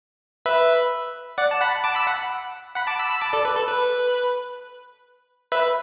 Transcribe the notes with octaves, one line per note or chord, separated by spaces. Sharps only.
B4 E5
D5 F#5
A5
F#5 B5
A5 D6
B5 E6
F#5 B5
F#5 B5
A5 D6
B5 E6
B5 E6
A5 D6
A4 D5
B4
A4
B4
B4 E5